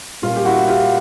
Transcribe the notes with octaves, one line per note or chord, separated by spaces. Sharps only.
A#2 G3 A#3 C#4 F4
G4
E4 F#4
F4 G4